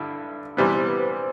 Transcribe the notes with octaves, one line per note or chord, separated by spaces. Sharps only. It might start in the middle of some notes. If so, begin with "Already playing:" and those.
Already playing: G2 D3 E4
C3 E3 G3 B3 C5
B4
B4